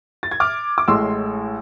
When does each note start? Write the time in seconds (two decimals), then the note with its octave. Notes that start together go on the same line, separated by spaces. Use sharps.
0.23 A6
0.31 G#6
0.40 D6 F6
0.78 D6
0.88 A1 A2 G#3 C6 E6